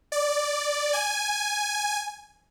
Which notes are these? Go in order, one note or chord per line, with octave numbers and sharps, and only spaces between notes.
D5
G#5